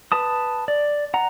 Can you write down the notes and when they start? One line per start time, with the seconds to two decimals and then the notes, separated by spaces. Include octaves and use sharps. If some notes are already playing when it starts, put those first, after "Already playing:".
0.12 B4 A5 D#6
0.68 D5
1.14 F#5 A#5